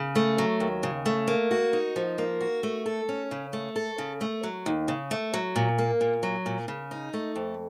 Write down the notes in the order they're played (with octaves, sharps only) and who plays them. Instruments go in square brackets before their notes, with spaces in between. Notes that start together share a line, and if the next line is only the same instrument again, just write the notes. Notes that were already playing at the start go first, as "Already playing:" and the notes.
Already playing: [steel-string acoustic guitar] C#3
A3
F#3
D#2
C#3
A3
A#3
F#4
D#4
F3
A#3
F#4
A3
A4
C#4
C#3
A3
A4
C#3
A3
F#3
D#2
C#3
A3
F#3
A#2
A#3
A#2
F#3
A#2
C#3
D#4
A3
F2